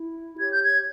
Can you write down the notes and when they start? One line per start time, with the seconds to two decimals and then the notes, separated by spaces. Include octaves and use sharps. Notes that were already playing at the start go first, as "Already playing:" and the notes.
Already playing: E4
0.38 G4 C#5 G#6
0.50 G6
0.63 G#6